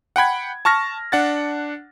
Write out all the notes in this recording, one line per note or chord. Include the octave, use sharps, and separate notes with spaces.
F#5 G5 B5 G#6
A5 C#6 F6 A#6
D4 F#5 A6